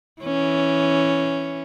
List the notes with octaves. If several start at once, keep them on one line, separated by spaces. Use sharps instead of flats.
E3 C#4